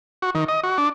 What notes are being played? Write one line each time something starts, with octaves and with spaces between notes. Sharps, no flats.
F#4
D#3
D#5
F#4
D4